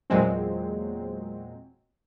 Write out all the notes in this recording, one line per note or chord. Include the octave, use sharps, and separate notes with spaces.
E2 A#2 F#3 G#3 C4